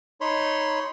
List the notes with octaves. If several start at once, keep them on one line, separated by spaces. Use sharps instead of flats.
D#4 C#5 B5 C6